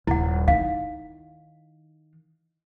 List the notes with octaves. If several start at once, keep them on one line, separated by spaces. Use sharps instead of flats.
D#1 E4 F#5
D#3 F5